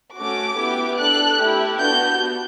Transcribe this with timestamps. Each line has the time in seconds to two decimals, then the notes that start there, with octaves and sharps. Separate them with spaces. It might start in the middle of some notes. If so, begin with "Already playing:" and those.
0.17 A3 C#4 F#4 D6
0.58 B3 E4 G4
0.99 D4 A4 F#6
1.40 A3 E4 G4
1.81 B3 D4 F#4 G6